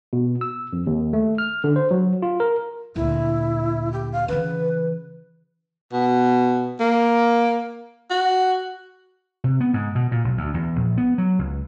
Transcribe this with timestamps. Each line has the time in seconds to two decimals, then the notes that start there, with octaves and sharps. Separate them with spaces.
0.13 B2
0.41 E6
0.73 F2
0.87 D#2
1.13 A3
1.38 F6
1.64 D3
1.76 C5
1.91 F#3
2.22 F4
2.40 A#4
2.96 D2 A#2 E4
3.93 G4
4.12 F5
4.28 C#3 E3 B4
5.93 B2
6.80 A#3
8.10 F#4
9.44 C3
9.61 B3
9.74 G#2
9.95 B2
10.12 A#2
10.24 B1
10.37 D2
10.54 E2
10.76 A#1
10.97 B3
11.18 F#3
11.39 C#2